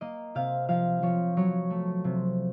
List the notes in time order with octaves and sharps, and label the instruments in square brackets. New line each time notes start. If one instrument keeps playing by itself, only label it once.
[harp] A#3 D#5
C3 F5
F3 F5
F3 C#5
F#3 C#5
A3
C3